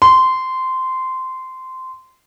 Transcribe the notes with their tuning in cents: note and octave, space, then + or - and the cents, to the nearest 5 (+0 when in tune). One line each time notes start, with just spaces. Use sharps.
C6 -15